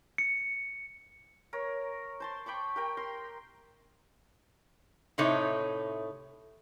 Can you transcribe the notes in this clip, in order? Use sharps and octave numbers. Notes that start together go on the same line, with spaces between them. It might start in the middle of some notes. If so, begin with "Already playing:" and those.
C#7
A#4 C#5
C5 A5 C6
G5 B5 C#6 D6
G4 A#4 G5
A#4 C6
A2 C3 A3 D#4 C#5